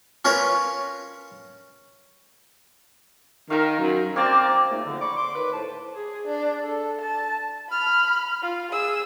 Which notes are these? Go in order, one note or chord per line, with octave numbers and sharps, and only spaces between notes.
C#4 F4 A#4 B4 C#5
D#3 A#4 F5
F#2
A#3 C4 D5
A#2 C#3 A3 A#3 D#4
F2 G#2 D3
D5 B5 C#6 D6
C6 D6
D#2 B4
A2 C5 A5
G#4
D4
A4
A5
B5 F6
F4
G#4 E6